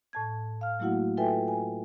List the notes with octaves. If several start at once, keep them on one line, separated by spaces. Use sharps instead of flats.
A2 A5 G#6
F5 F6
F#3 A3 A#3 E4 F#4 F#5
F4 A4 B4 E5 G5 G#5
G#5